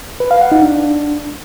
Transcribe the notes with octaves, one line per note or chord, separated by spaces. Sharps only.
B4
F5
F#5
D#4
D4